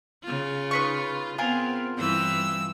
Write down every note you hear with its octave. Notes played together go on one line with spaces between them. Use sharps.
C#3 F4
D#4 B4 C#6
B3 C4 F4 G#4 A#4
G2 E3 C4 E6